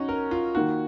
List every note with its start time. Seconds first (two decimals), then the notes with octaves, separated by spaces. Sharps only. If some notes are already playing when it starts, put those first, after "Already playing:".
Already playing: C#4 D#4 F#4
0.09 A#4
0.31 F4
0.55 D#3 A#3 D#4 F#4